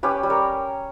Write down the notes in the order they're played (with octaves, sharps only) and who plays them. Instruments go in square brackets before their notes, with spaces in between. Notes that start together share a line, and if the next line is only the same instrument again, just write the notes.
[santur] C#4 G4 B4
G3
A#4 C#5